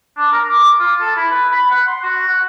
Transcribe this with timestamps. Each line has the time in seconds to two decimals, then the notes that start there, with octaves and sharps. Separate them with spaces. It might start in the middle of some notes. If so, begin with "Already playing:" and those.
0.17 D4
0.32 A#4
0.49 D6
0.79 F4
1.00 A4
1.16 E4
1.30 B4
1.51 B5
1.70 F#5
1.87 C6
2.03 F#4
2.28 F#5